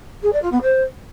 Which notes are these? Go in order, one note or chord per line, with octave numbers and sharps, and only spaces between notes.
G#4
D5
F4
B3
C5